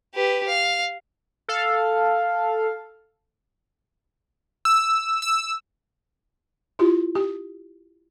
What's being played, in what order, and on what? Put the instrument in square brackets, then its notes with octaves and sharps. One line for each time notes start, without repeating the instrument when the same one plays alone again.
[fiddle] G4 B4
F5
[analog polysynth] A4 F5
[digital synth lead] E6
E6
[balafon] E4 F4 G4
G4